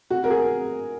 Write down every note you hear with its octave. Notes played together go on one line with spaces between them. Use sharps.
F#4
A#4
G#4